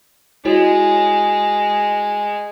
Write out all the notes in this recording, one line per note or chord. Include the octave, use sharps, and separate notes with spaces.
G#3 E4 F#4 C#5